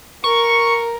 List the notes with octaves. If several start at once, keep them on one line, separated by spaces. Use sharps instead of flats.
A#4 C#6